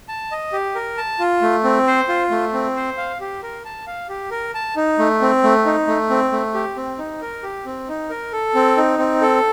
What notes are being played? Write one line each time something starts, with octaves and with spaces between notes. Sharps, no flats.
A5
D#5
G4
A#4
A5
F4
A3
C4
C5
F4
A3
C4
C5
F5
G4
A#4
A5
F5
G4
A#4
A5
D#4
A3
C4
A3
D#4
A3
C4
A3
G4
C4
D#4
A#4
G4
C4
D#4
A#4
A4
C4
D#4
C4
A4